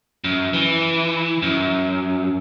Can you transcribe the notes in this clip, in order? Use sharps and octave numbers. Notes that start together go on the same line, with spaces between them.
F#2
E3
F#2